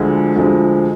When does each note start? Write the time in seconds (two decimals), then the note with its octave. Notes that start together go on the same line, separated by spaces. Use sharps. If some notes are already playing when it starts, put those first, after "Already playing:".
Already playing: D2 D3 F3 G#3
0.36 D2 D3 F3 G#3